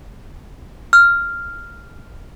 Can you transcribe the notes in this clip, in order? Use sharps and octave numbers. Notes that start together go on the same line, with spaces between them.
F6